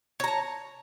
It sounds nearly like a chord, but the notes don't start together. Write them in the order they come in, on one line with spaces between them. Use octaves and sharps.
C#5 A#5 A5